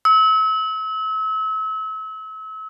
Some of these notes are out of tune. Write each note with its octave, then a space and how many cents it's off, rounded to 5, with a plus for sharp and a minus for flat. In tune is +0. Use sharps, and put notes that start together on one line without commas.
E6 -35